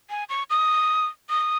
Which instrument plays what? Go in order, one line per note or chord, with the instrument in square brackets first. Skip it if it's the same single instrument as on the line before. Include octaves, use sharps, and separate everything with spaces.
[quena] G#5
C#6
D#6
D#6